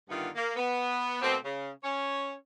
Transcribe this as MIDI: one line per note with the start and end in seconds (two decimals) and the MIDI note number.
0.09 0.28 43
0.09 0.28 50
0.09 0.28 51
0.09 0.28 59
0.09 0.28 64
0.09 0.28 65
0.35 0.55 58
0.56 1.18 59
1.22 1.36 47
1.22 1.36 57
1.22 1.36 58
1.22 1.36 60
1.44 1.70 49
1.84 2.33 61
1.84 2.33 73